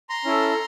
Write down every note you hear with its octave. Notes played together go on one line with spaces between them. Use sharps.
A#5 C6
C#4 E4 A4